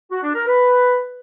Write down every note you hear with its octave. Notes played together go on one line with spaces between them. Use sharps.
F#4
D4
A#4
B4